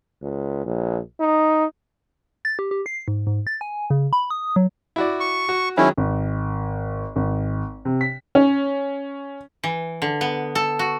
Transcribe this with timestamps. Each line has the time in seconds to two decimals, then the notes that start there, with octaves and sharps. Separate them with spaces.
0.22 C#2
0.66 A#1
1.20 D#4
2.45 A6
2.59 G4
2.71 G4
2.86 C7
3.08 G#2
3.27 G#2
3.47 A6
3.61 G#5
3.90 C#3
4.13 B5
4.30 D#6
4.56 F#3
4.96 E4 F#4 D5
5.20 C#6
5.49 F#4
5.77 D#3 F#3 G#3 C#4 E4
5.97 G#1
7.16 G#1
7.85 C3
8.01 B6
8.35 C#4
9.63 E3
10.02 D3
10.21 B3
10.55 A4
10.79 F#4